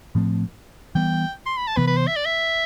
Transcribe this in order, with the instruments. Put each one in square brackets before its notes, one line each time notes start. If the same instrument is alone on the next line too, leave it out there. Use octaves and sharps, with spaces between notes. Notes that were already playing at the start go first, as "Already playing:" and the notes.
[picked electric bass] A2 F3 A3 C4
[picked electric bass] E3 G3 B3 [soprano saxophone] G5
[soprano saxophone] C6
B5
A5
[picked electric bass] C3 E3 B3 [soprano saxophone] B4
[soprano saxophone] B4
C5
E5
D5
E5